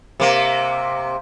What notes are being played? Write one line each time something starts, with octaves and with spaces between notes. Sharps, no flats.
C3 A#3